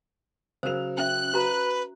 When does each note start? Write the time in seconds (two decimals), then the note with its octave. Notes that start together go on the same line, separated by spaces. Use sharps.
0.63 C#3 F#3 A#4 C5 F7
0.98 C#4 E5 F#6
1.34 F#4 B4 A#5